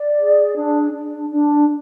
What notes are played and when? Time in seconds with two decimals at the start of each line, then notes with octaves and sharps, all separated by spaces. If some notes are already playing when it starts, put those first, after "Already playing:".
Already playing: D5
0.19 G#4
0.56 D4
0.93 D4
1.31 D4